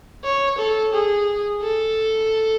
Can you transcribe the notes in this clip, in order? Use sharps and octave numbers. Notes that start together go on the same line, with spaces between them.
C#5
A4
G#4
A4